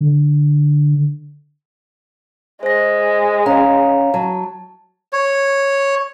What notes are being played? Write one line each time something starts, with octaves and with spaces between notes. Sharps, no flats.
D3
G#3 C5 A#6
C#4 F5 A#5
F#3 A5
C#5